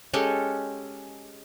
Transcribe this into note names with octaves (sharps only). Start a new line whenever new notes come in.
G#3 C#4 G4 A4